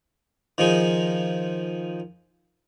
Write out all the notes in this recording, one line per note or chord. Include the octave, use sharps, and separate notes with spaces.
D#3 F3 D#4 G#4